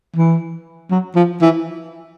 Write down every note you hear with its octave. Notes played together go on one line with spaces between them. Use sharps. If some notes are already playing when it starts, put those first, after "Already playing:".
E3
F#3
F3
E3